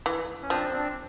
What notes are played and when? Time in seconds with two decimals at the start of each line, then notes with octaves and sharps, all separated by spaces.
0.06 E3
0.43 C#4
0.50 F3 C4 D4
0.73 C4 D4